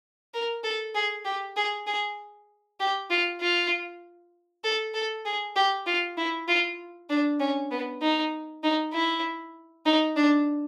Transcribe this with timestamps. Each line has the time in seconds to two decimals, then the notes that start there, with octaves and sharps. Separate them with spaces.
0.34 A#4
0.64 A4
0.95 G#4
1.25 G4
1.57 G#4
1.87 G#4
2.80 G4
3.10 F4
3.41 F4
4.64 A4
4.94 A4
5.25 G#4
5.56 G4
5.86 F4
6.17 E4
6.48 F4
7.09 D4
7.40 C#4
7.71 B3
8.02 D#4
8.64 D#4
8.93 E4
9.86 D#4
10.16 D4